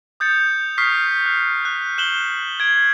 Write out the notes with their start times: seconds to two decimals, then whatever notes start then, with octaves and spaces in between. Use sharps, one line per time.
0.20 D#6 G6 A6 C#7
0.78 C#6 D#6 F6 B6 C7
1.26 F#6
1.65 F#6
1.98 F#6 E7 F#7 G7
2.60 G#6 D7